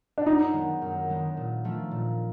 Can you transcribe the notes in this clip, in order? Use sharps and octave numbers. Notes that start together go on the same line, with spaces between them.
D4
F#2 D#4
D#3 G#3 B3 D4
F#2
D#3 G#3 B3 D4
A#2
F3 A3 D4 F4
A#2